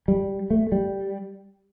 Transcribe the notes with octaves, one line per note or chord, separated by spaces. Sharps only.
G3
A3
G3